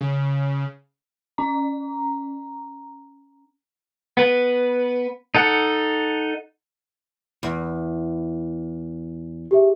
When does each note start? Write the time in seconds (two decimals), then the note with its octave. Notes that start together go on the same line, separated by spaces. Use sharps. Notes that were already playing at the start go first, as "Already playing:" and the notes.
0.01 C#3
1.38 C#4 A#5
4.17 B3 B4
5.35 D#4 A4 F#5
7.43 E2
9.51 G4 G#4 E5